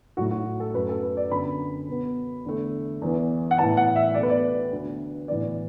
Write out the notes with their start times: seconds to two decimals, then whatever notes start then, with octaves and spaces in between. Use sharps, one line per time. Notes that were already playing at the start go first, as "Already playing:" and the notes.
0.17 A2 F#3 A3 F#4
0.31 F#4
0.60 A4
0.74 F#2 F#3 A3 B4
0.89 A4
1.03 B4
1.17 D5
1.31 F#2 D3 B3 B5
1.88 B2 B3
2.45 E2 D3 A3
3.02 E2 E3 B3
3.51 F#5
3.58 A2 E3 B3 A5
3.77 F#5
3.96 E5
4.14 B2 A3 D5
4.23 B4
4.30 D5
4.72 D2 D3 B3
5.28 A2 E3 B3 D5